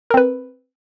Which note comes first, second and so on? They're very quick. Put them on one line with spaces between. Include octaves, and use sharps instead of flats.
A#4 C4 B4